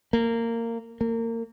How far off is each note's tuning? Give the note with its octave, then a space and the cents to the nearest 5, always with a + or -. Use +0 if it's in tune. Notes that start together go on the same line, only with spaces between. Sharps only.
A#3 -20
A#3 -30